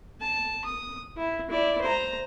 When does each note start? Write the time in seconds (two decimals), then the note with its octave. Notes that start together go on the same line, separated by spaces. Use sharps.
0.21 A5
0.65 D#6
1.17 E4
1.50 E4 D5
1.81 C5 A#5